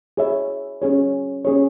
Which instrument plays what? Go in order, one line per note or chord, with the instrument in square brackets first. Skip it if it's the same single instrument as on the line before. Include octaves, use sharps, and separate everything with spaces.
[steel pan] G#4 C#5 E5
C#4 G#4 C#5
C#4 G#4 C#5